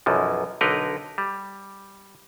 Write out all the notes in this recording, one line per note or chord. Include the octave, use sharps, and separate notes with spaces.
B1 F#2 E3 F3
B1 D3 D#4 A#4 B4 D#5
G3